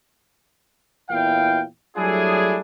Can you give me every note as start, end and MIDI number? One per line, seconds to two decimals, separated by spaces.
1.10 1.63 40
1.10 1.63 46
1.10 1.63 64
1.10 1.63 77
1.10 1.63 79
1.97 2.59 54
1.97 2.59 55
1.97 2.59 57
1.97 2.59 62
1.97 2.59 64
1.97 2.59 68